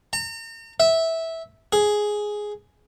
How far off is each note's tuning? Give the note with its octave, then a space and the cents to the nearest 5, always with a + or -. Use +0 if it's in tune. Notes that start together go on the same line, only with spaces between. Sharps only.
A#5 -40
E5 -10
G#4 +5